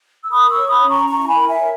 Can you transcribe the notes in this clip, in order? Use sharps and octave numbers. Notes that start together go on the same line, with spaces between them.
E6
A#4 B5 D#6
C#6 E6
C#5
B5 D#6
C#4
A#5 C#6
E4 A#5 C#6
A#5
G#5 B5
A#4
E5 G#5
C#5